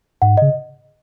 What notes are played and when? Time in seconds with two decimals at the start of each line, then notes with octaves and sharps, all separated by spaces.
0.22 G#2 F#5
0.37 C#3 D#5